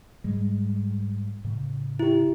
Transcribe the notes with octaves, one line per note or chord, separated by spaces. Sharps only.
G#2 G3 G#3
A2 C#3
E4 G4